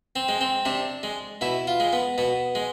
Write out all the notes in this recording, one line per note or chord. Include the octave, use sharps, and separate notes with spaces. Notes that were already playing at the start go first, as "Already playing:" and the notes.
C4
G#3
C4
C3 D4
G#3
B2 E4
F4
G#3
B3
B2 B3
G#3